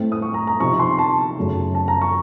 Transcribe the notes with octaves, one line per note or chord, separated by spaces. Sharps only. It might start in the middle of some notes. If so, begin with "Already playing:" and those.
Already playing: A2 A3 C4
D#6
C#6
A#5
A#5
C3 F3 C4 D#4 C#6
C6
A5
F#2 C#3 A3
A5
A#5
C#6